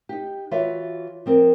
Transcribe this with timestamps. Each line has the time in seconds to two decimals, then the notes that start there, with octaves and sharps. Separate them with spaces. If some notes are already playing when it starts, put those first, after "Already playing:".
0.09 D#4 G4
0.51 E3 F4 F#4 C#5 E5
1.26 F3 C4 A#4